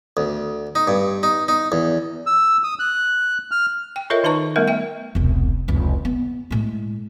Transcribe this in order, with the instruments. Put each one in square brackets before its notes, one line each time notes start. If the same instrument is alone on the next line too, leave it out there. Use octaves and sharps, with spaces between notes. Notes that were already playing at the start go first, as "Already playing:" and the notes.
[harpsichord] D2
D#4
G2
D#4
D#4
E2
[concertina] E6
D#6
F#6
F6
[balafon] G5
F4 A4 A#4 C#5 D#5 E5
D#3 D#4 B4 A5 A#5 C#6
G3 A3 B3 A#4 E5
E5 G5
[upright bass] E1 C2
F1 C#2
B3
A2 G#3